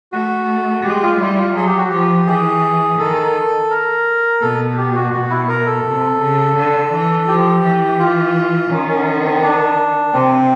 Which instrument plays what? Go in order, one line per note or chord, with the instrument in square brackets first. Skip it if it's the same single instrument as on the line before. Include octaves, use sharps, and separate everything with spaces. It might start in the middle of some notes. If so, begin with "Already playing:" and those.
[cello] A3 [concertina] F#4
[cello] G#3 [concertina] G4
[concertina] F4
[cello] G3 [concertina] E4
[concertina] F4
[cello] F#3 [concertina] G#4
[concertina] G4
F#4
[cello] F3 [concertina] G4
[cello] E3 [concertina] G#4
[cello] D#3 [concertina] A4
[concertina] A#4
[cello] B2 [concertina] A4
[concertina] G4
F#4
[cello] B2 [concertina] F#4
[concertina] E4
A#4
A4
[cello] C3
C#3
D3
E3
[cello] F3 [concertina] G4
[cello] E3
[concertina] F4
[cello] D#3 [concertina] C#4
[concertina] C#4
C#4
C4
D4
[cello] C3 [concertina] C4